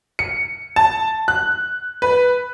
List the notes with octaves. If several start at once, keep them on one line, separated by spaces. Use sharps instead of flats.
C#7
A5
F#6
B4